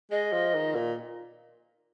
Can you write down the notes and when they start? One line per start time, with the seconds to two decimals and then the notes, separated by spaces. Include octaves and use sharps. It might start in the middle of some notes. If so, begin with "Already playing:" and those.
0.11 G#3 D#5
0.33 F3
0.54 D#3
0.75 A#2